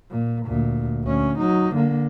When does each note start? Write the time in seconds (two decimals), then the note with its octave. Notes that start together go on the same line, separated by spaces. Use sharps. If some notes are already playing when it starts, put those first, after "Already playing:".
0.11 A#2
0.46 D2 A#2
1.04 D2 C#4
1.39 F#3 D#4
1.74 D3 A#3